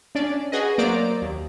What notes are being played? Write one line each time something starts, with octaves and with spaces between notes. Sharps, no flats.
C#4 D4 D5
F#4 G#4 B4 D#5
F#3 A#3 C5 D5 A#5 D7
D#2